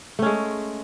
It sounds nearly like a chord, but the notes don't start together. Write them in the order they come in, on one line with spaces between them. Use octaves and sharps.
A3 C#4 G#3